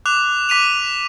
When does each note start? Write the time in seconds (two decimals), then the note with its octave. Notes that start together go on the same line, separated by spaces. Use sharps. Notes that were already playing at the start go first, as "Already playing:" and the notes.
0.06 D6 F#6 F7
0.49 D6 B6 D#7 F7